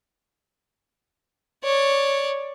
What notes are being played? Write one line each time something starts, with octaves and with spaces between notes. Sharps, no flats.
C#5 D5